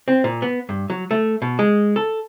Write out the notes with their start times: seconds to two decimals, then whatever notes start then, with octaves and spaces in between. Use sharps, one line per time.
0.08 C4
0.24 A#2
0.42 B3
0.69 G2
0.90 F#3
1.11 A3
1.42 B2
1.59 G#3
1.96 A4